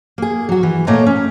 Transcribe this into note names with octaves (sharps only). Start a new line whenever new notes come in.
A#3 G#4
F#3 F#4
E3
A#2 A3 A#3 C#5 D#5 A#5
C#4